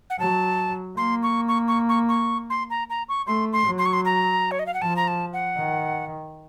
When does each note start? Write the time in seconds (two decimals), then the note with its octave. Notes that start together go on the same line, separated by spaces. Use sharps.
0.10 F#5
0.19 F#3 A5
0.96 A#3 C6
1.23 C#6
1.48 C#6
1.68 C#6
1.89 C#6
2.09 C#6
2.50 C6
2.70 A#5
2.90 A#5
3.09 C#6
3.27 A3 C6
3.53 C6
3.66 F#3
3.78 C6
3.86 C#6
3.93 C6
4.05 A#5
4.51 C#5
4.59 D#5
4.66 F5
4.74 F#5
4.81 F3 A5
4.96 A#5
5.08 A5
5.33 F#5
5.58 D#3